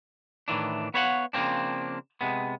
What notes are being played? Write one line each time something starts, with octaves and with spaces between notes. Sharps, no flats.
A2 D#3 E3 D4
B3 B4 C#5 F5 F#5
C#3 F3 A#3 C4 D4
C3 G#3 B3